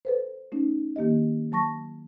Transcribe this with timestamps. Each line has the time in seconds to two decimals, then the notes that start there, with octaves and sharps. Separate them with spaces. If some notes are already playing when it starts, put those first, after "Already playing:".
0.05 A4 B4 C5
0.52 A3 C#4 D#4
0.96 D#3 A#3 G4 D#5
1.52 F#3 A5 C#6 A#6